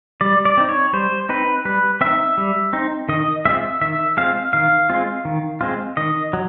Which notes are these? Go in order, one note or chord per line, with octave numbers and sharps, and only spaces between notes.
G3 D5
D5
C4 D#4
C#5
G3 C5
C4 D#4 B4
G3 B4
C4 D#4 E5
G3
C4 D#4
D#3 D#5
G#3 C4 F4 E5
D#3 E5
G#3 C4 F4 F5
D#3 F5
G#3 C4 F4
D#3
G#3 C4 F4
D#3 D#5
F#3